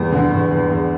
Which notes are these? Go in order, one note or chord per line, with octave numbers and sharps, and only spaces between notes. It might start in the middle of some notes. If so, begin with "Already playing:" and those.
Already playing: E2 G3
D3
E2
E2
E2